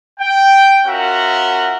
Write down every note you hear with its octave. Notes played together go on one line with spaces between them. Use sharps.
G5
C#4 F4 F#4 A#4 E5 F#5